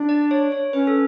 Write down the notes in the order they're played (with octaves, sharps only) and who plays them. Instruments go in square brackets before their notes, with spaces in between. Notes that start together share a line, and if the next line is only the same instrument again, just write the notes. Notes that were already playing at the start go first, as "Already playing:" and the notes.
Already playing: [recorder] D4
[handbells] D5
C#5
C#5
[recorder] C#4 [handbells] B4
[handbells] A4